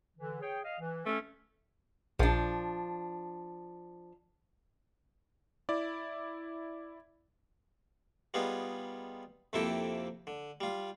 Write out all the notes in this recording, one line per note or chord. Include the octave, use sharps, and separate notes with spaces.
D3 E3
G#4 C#5 G5
D#5 F5
E3
A3 C#4
A#1 F3 D4
E4 D5
G3 B3 D#4 F4 G#4
F2 C3 A#3 E4 A4 G5
D3
G3 F4